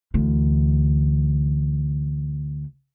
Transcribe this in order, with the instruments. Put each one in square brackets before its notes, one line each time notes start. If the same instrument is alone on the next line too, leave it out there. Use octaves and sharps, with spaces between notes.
[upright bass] D2 E3